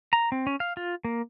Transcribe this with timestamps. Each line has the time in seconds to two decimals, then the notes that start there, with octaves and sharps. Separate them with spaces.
0.13 A#5
0.32 C4
0.47 C#4
0.60 F5
0.77 F4
1.05 A#3